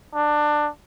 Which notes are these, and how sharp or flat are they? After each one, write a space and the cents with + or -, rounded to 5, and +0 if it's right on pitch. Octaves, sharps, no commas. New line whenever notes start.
D4 +20